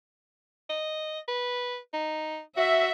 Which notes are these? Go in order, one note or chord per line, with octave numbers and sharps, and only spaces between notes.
D#5
B4
D#4
F#4 E5